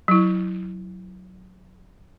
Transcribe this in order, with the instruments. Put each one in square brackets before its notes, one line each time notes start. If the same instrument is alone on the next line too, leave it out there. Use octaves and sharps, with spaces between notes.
[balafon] F#3 E4